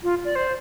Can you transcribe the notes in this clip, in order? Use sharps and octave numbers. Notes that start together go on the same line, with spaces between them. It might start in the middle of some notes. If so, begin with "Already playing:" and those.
F4
D5
C5